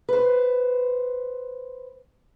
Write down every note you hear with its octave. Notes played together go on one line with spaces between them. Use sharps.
B4 C5